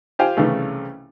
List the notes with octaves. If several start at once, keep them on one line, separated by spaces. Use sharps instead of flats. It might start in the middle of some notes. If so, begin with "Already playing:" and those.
F4 G4 C5 F5 G5 G#5
C2 C#3 E3 A3